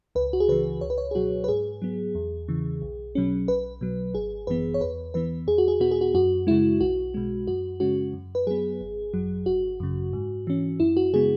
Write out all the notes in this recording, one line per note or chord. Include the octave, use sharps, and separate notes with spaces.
C#2 B4
F#4
G#4
C#3 E3 B4
C#2 C#5
B4
C#5
G#4
B2 F#3 F#4
B4
G#2 G#4
F#3 B3
E2
C#3 E3
B1
B2 F#3 C#4
B1 B4
B2 F#3
G#1 G#4
F#2 E3 B3 B4
C#5
E2 B4
E3 B3 B4
E2 G#4
F#4
G#4
B2 B3 F#4
G#4
F#4
F#2 F#4
C#3 G#3 E4
B1 F#4
B2 G#3
F#2 F#4
C#3 G#3 C#4 F#4
F#2
B4
F#3 B3 G#4
G#1
F#2 F#3
G#1 F#4
F#2 C#3
G#2
E3 C#4
F#2 E4
F#4
C#3 G#3 B3 G#4